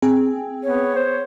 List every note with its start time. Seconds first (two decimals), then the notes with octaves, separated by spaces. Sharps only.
0.02 C4 G#4
0.63 B3 C#5
0.96 C5